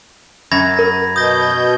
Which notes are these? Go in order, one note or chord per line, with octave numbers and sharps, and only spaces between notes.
F#2 B5 G#6 A#6
A#4
B2 D#6 G6 A#6